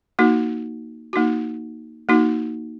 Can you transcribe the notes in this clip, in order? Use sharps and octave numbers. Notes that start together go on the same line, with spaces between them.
A#3 D#4 F#4
A#3 D#4 F#4
A#3 D#4 F#4